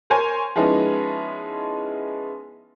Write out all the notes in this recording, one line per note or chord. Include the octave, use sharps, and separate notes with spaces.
A#4 C5 C#5 G#5
F3 G#3 B3 C#4 D#4 E4